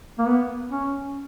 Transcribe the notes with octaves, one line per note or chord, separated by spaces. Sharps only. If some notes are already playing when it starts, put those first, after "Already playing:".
A#3
B3
C#4